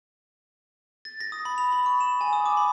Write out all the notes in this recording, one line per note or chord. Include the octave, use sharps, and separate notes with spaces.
A6
A#6
D#6
B5
F7
B5
C#6
E7
G#5
D#6
D6
B5